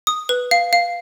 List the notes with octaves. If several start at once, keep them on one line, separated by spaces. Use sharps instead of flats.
D#6
B4
F5
F5